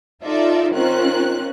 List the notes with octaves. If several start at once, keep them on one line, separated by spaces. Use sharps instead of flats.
D#4 F4 A4 D5 E5
D#3 C4 C#4 F4 F#6